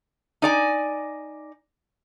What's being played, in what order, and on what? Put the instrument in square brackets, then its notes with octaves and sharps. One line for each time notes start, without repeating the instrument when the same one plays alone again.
[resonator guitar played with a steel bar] D#4 D5 G#5